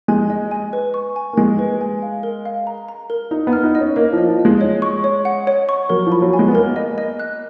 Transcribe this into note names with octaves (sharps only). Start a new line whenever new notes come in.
G#3 G#5
D#5
G#5
B4
C#6
G#5
A#3
G#3 G#5
B4
G#5
F5
A#4
F5
A#5
A#5
A#4
D#4 A#5
B3
F6
D#4
D#5
C#4
A#3 D#5
F3 D#5
F3
D#5
G#3
C#5
C#6
C#5
F#5
C#5
C#6
F#3 A#4
F3
B5
F#3
G#5
G#3
B3
A#3 A#4
D#5
D#5
F#6